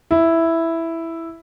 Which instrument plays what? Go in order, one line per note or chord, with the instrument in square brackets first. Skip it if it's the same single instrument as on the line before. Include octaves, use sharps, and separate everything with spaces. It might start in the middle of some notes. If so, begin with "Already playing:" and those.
[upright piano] E4